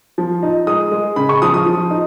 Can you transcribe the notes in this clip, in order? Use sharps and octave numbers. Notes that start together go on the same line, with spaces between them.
F3
D#4
G#3 D#6
G#3
C#3 B5
C#6
F3 D#6
D#6
F3
D#4